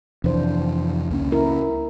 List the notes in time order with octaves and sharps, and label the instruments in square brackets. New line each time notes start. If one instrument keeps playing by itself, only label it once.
[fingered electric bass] F2 C3 E3 [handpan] D4 C5
[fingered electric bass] C#2 A#3 C#4
[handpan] E4 A#4